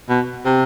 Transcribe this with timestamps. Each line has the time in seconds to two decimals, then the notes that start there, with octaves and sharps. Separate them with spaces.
0.09 B2
0.45 C3